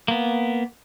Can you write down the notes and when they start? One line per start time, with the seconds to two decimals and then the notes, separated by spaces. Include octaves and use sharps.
0.08 A#3 B3